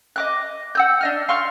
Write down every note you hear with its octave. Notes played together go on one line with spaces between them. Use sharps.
D#5 D6 F#6
F#5 E6 G6
D4 D#5 F6
F5 C6 C#6 F6